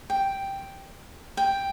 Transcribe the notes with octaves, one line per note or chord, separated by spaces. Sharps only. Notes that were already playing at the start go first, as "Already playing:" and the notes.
G5
G5